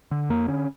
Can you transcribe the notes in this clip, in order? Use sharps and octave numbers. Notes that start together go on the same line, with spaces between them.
D3
F2 A#3
D3 C#4